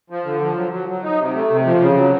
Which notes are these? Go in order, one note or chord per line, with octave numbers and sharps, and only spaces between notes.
F3
D3
F3
F#3
F#3
F#3
D#4
C3
A3
C3
F3
C#3
F#3